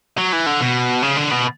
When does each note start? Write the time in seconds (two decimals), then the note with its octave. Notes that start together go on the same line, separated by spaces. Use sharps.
0.18 F#3
0.33 E3
0.46 D3
0.61 B2
1.03 C#3
1.17 D3
1.31 B2